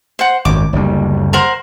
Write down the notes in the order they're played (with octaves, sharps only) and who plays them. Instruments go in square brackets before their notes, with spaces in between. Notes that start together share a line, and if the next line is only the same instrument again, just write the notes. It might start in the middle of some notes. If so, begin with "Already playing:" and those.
[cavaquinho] C5 F#5
[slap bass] G#1 F#2 [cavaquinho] D6
[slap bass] F#1 D2 G3
[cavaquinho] A#4 C5 F#5